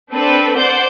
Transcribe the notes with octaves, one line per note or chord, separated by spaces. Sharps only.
C4 D4 A4 B4
C5 D5 F#5 G6